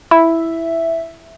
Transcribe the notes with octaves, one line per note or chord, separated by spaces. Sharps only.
E4 E5